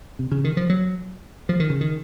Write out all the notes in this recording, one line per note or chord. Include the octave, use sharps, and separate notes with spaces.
C3
C#3
D#3
F3
F#3
F3
D#3
C#3
D#3